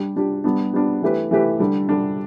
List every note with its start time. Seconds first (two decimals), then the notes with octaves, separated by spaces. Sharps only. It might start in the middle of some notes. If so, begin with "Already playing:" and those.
Already playing: G3 D4 G4
0.16 G3 D4 G4
0.44 G3 B3 D4
0.74 G3 B3 D4
1.03 E3 A3 G4 B4
1.31 E3 A3 G4 B4
1.59 D3 G3 D4
1.89 D3 G3 D4